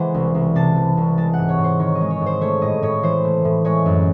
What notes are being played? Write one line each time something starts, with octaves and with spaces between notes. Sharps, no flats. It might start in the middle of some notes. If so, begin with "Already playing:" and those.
Already playing: E3 G#3 C5 F#5
C2
C2
C3 A5
E3
C2
G#3 A5
F#5
G#2
C#5
G#2
C5
D#3 C#5
D#5
G#3
C#5
G#2
C5
A3 C#5
A2 D#5
A2 C#5
E3 C5
A3
A2
G#3 C#5
F#2